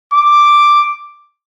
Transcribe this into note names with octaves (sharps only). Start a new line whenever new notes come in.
D6